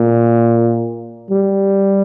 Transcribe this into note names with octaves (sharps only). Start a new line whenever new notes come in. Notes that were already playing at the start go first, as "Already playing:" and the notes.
Already playing: A#2
G3